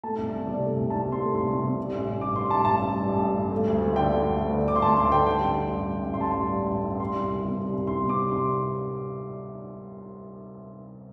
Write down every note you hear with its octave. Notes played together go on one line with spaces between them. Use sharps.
A3 A5
C2
C2
C3 D5
A3
C2
C2 A5
C3
C6
A3
C2 C6
C2
C3
G3
A1
A1
G2 D6
G3 C6
A1 A5
A1 A5
G2
G3
A1
A1
G2
A3
D2
D2
D3 G5
A3
D2
D2
D3
A3 D6
C6
D2 A5
D2 C6
D3 G5
G3 G5
A1
A1
G2
G3
A1
A1 C6
A5
G2 C6
G3
A1
A1
G2
G3 C6
C2
C2
C3
G3
C2
C2 C6
C3
D6
G3
C2 C6